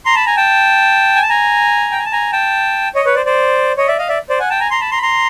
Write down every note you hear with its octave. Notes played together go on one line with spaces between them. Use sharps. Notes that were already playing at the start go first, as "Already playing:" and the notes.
A#5 C6
A5 B5
G#5 A#5
G5 A5
G#5
A5
G#5 A#5
G5
G#5
A5
G#5 A#5
G5 A5
C#5 D#5
B4 C#5
C5 D5
C5 D5
C#5 D#5
D5 E5
D#5 F5
D5 E5
C5 D5
F#5 G#5
G5 A5
G#5 A#5
A#5 C6
A5 B5
A#5 C6
B5
A#5 C6